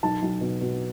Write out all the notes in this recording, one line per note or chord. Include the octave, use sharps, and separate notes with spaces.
B1 A5
B1
B2
B2